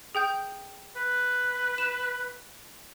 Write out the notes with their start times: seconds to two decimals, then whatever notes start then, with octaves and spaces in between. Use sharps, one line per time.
0.15 G#4 G5 G6
0.96 B4
1.78 E7